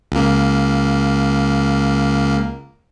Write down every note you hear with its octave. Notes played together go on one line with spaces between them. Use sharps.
C#2 A#3